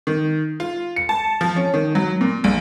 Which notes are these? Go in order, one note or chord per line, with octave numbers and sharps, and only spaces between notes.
D#3
F4
C#7
A5
F3
C#4
D#3
F#3
A#2
A#1